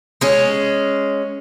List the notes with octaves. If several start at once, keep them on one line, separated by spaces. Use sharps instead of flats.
G#3 C#4